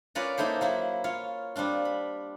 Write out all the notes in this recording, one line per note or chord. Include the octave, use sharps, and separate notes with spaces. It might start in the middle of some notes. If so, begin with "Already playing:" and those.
C#4 F4 A#4 B4 C#5 D5
A#3 D#4 E4 A4 C5
F#3 A#3 E4
F4 C#5 F5
G3 C4 D4 F4
B5